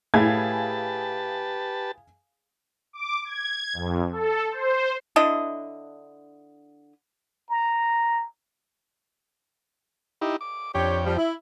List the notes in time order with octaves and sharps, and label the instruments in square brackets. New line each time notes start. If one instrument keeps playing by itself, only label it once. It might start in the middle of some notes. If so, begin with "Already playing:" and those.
[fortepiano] A2 [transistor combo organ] G4 B4 A5 [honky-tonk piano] G#4 F5 G#6
[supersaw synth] D6
G#6
F2
A4
C5
[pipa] D3 D4 E4 D#5
[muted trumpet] A#5
[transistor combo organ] D#4 E4 G4
D6
[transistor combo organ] F2 G5 [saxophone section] D4 G4 C#5
[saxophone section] F3 G3
E4